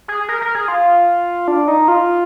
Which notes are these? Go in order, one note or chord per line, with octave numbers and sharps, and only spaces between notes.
G#4
A#4
A#4
G#4
F4
D4
D#4
F4